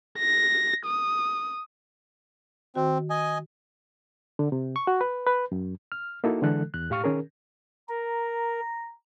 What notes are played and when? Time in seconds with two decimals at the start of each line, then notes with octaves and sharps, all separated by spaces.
0.19 A#6
0.86 D#6
2.75 D#3 C4 F#4
3.10 D#5 G#5
4.39 D3
4.52 C3
4.76 C#6
4.87 F#4
5.01 B4
5.27 B4
5.52 F#2
5.92 F6
6.24 A#3 D#4 E4 F#4 A4
6.42 D3 E3 G#3 A4 F#6
6.74 E2 F#6
6.90 A2 G4 F5 C#6 F6
7.04 D#3 C#4 G#4 A#4
7.89 A#4 A#5